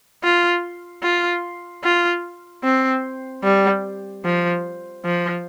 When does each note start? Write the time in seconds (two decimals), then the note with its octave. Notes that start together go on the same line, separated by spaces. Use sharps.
0.23 F4
1.03 F4
1.84 F4
2.64 C4
3.44 G3
4.24 F3
5.05 F3